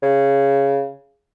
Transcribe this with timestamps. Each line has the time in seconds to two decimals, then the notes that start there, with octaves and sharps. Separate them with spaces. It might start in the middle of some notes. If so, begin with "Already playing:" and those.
0.02 C#3